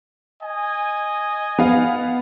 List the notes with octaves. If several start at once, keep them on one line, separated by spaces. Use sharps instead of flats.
D#5 G#5
B3 F5